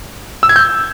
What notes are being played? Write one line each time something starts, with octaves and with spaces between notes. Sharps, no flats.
E6
G#6
G6